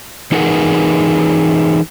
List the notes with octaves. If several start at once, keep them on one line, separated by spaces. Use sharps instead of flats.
E3 D#4 G#4 A#4 B4 F#5